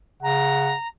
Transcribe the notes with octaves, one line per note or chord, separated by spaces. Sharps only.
C#3 F#5 A#5